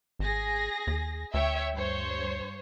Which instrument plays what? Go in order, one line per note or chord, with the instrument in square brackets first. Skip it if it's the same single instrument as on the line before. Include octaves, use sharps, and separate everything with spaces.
[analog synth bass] G#1 [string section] G#4 A#6
[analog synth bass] D#2
[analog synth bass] D2 [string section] C#5 E5 G5
[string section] G2 C5 C#5